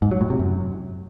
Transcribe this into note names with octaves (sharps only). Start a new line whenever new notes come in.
G#2
F#3
A2
C3
F#2